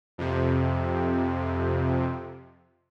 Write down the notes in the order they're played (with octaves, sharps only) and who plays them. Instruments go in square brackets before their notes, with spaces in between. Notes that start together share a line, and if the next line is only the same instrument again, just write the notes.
[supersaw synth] F2 C3